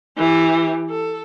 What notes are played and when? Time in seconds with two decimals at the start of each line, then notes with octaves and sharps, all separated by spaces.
0.18 E3 G4
0.90 A4